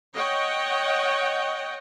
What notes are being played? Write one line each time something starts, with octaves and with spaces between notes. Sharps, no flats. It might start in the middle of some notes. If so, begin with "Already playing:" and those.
C#5 D#5 F#5 G5